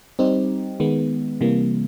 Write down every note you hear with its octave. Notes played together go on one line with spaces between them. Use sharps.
G3 C4 D#4 G4
D#3 G#3 B3
C3 E3 G3 A#3